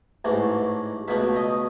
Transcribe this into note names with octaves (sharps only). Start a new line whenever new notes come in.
A1 G#2 E3 A3
C#2 B2 F#3 A3 E5
D#5